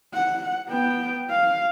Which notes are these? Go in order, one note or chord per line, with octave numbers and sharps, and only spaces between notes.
F#5
B3 G5
F5